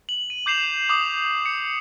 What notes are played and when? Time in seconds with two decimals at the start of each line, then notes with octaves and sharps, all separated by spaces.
0.09 F#7
0.30 D#7
0.46 D6 G6 C7 E7 F7
0.89 D6 D#6
1.46 C#7